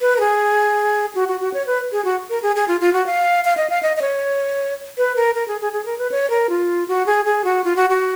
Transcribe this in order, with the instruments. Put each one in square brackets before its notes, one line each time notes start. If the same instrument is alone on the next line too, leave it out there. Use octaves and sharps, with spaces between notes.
[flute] B4
A#4
G#4
F#4
F#4
F#4
C#5
B4
G#4
F#4
A#4
G#4
G#4
F4
F4
F#4
F5
F5
D#5
F5
D#5
D#5
C#5
B4
A#4
A#4
G#4
G#4
G#4
A#4
B4
C#5
A#4
F4
F#4
G#4
G#4
F#4
F4
F#4
F#4